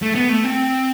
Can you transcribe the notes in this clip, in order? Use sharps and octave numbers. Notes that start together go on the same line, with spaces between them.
A3
B3
A3
C4